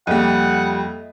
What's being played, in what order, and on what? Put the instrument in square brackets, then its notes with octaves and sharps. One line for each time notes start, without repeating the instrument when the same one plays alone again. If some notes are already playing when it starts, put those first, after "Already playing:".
[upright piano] F2 G3 [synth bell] A#3 D#7 [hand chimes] A4 D#5 E5 [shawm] F#5